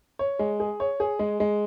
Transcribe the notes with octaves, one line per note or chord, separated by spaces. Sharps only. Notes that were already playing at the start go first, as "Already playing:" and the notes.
C#5
G#3
G#4
C#5
G#4
G#3
G#3